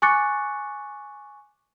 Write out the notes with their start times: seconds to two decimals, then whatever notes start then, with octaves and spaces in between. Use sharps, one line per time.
0.02 G#5 C#6 D6 F#6 A6 C#7